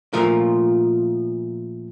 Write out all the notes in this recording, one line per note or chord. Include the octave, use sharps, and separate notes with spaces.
A#2 F3 A3 F4 A#4